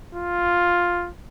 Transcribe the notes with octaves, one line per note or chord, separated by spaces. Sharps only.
F4